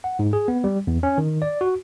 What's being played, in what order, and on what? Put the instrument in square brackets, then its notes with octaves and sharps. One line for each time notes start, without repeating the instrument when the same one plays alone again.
[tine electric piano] F#5
G#2
G#4
B3
G3
E2
C#4
D#3
D5
F#4